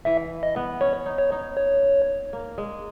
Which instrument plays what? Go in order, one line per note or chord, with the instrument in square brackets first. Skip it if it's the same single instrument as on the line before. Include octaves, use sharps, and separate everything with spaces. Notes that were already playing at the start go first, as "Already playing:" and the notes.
[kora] E3 [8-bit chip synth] E5
[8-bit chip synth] D#5
[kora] B3
[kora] C#4 [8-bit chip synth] C#5
[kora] D#4
[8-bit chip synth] C#5
[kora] D#4
[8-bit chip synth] C#5
[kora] A#3
G#3